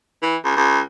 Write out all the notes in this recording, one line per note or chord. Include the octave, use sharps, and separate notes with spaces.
E3
C#2
C#2